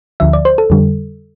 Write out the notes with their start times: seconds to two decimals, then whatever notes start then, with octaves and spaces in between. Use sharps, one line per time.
0.20 D2 D3 F3 E5
0.33 D5
0.45 C5
0.58 A4
0.70 F2 D3 G3